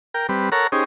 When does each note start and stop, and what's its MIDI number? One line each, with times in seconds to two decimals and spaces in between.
0.14 0.27 70
0.14 0.27 79
0.29 0.50 55
0.29 0.50 60
0.29 0.50 71
0.52 0.67 69
0.52 0.67 70
0.52 0.67 73
0.52 0.67 78
0.52 0.67 82
0.72 0.84 61
0.72 0.84 63
0.72 0.84 67
0.72 0.84 68
0.72 0.84 72